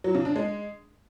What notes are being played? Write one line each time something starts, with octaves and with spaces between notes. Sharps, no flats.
F#3
C#3
D4
G#3